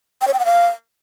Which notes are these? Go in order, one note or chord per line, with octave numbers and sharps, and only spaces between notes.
G5
C#5
G5
F#5
F5